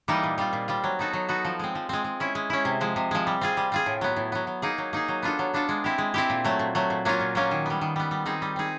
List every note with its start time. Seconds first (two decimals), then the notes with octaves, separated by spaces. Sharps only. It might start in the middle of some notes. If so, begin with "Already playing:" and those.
0.08 E3 G3 A#3 D#4
0.23 A#2
0.38 G3 C4 F4
0.53 A#2
0.68 G3 C4 F4
0.84 F#3
0.99 B3 D#4 F#4 A4
1.13 F#3
1.29 B3 D#4 F#4 A4
1.45 F3
1.59 G#3 C4
1.75 F3
1.89 G#3 C4
2.04 G#3
2.20 C#4 E4
2.35 G#3
2.50 C#4 E4
2.65 C3
2.81 F3 G#3
2.96 C3
3.11 F3 G#3
3.27 G3
3.41 C4 F4 G#4
3.57 G3
3.72 C4 F4 G#4
3.86 A2
4.01 F#3 B3
4.16 A2
4.32 F#3 B3
4.47 F#3
4.62 A#3 D#4 G#4
4.78 F#3
4.93 A#3 D#4 G#4
5.08 F#3
5.23 B3 D4 F4 A4
5.39 F#3
5.54 B3 D4 F4 A4
5.69 G#3
5.84 C4 E4 G4
5.98 G#3
6.14 C4 E4 G4
6.30 A#2
6.44 F#3 A3
6.59 A#2
6.75 F#3 A3
6.90 A#2
7.05 F#3 A#3 C#4 F4
7.20 A#2
7.35 F#3 A#3 C#4 F4
7.51 D#3
7.66 G3 B3
7.81 D#3
7.96 G3 B3
8.11 G3
8.26 C4 D#4 G#4
8.42 G3
8.56 C4 D#4 G#4